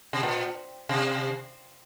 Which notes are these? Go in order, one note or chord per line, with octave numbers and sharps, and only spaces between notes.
C3
A#2
C3